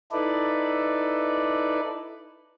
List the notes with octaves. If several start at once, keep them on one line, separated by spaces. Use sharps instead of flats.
D#4 E4 A4 B4 D5